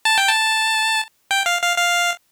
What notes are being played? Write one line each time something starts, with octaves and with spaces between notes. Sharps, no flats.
A5
G5
A5
G5
F5
F5
F5